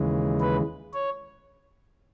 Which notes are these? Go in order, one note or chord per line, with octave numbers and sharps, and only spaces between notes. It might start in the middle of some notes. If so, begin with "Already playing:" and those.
Already playing: D#2 C#3 E3 G#3
B4
C#5